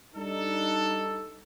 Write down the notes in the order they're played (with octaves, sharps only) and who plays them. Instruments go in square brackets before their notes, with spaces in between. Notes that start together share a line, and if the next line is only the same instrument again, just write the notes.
[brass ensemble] G3 D4 D#4 A4